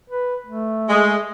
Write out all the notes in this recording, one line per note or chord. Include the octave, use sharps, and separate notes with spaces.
B4
A3
G#3